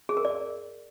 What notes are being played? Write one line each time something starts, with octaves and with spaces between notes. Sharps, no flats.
G#4
A#4
D5